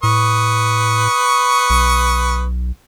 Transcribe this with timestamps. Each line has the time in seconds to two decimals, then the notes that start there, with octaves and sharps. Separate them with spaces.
0.03 A2 B4 C#6 D#6
1.70 B1